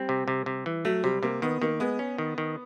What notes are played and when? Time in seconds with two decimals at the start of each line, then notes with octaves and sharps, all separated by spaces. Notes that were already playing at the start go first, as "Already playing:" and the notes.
Already playing: G3 C4
0.09 C3
0.28 C3
0.46 C3
0.66 E3
0.85 F#3 A3
1.03 C3 G3
1.23 C3 A#3
1.42 D#3 B3
1.62 D#3 A#3
1.80 G#3 B3
1.99 C#4
2.18 D#3
2.38 D#3